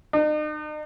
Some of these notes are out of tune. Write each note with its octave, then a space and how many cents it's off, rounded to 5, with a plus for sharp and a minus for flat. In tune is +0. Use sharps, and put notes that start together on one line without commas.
D#4 -40